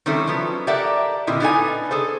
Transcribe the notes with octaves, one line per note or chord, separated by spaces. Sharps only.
D#3 G3 C4 C#4 E4 A4
F3 F#3 B3 A4
G4 A4 A#4 D5 E5 F#5
A#2 D3 C4 E4 D#5
B3 D4 D#4 A4 F5 G#5
G#4 A4 C5